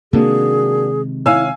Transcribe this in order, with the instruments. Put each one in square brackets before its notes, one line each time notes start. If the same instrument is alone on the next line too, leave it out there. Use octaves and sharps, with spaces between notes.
[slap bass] C3 D#3 G#3 [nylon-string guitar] A#3 D4 F#4 [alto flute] G#4
[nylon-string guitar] D#4 E4 C#5 [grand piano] F5 G#5 E6